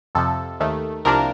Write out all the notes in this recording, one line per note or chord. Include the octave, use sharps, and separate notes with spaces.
F2 C3 F3 A4
D#2 D#3 A3
C2 C3 F3 A#3 D4 A#4